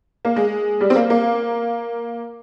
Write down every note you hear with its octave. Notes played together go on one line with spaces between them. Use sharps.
A#3
G#3
G3
C4
A#3
A#3